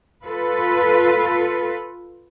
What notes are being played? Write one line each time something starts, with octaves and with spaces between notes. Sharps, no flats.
F4 A4 B4